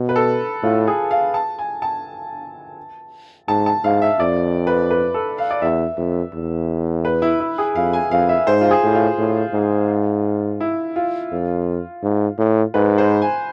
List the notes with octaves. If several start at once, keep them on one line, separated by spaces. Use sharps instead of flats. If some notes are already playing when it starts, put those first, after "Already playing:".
Already playing: B2
B4
A4
A2 F4
G#4
F5
A5
G#5
A5
G#2 A5
A5
G#2 F5
E5
F2 D5
B4
B4
A4
F5
D5
E2 E5
F2
E2
B4
E4
E4
G#4
F2 F5
G#5
F2 F5
E5
G#2 C5
F4
G#4
A2
F4
A2
G#2
E4
F4
F2
G#2
A2
G#2 B4
C5
G#5